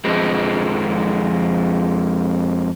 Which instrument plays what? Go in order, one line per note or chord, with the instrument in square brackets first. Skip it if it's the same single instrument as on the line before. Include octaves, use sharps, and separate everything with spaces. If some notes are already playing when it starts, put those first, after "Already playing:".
[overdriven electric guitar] F2 G#3